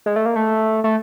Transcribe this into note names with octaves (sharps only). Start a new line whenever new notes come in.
G#3
A3
A#3
A3
A3